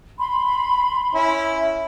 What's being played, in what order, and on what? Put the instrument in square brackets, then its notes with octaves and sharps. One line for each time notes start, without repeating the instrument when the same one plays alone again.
[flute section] B5 C6
[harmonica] C#4 E4